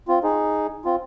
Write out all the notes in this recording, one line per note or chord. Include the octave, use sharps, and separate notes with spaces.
C4 F4
D#4 G#4
C4 F4